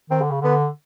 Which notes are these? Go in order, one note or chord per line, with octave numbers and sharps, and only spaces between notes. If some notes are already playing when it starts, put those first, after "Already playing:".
D#3 C4
D3
C#3
D3 B3